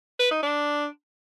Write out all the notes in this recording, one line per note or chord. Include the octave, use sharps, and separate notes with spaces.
B4
D#4
D4